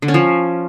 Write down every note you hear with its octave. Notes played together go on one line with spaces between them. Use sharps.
D3
C#4
F3